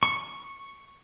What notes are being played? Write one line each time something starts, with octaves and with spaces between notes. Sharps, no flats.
C#6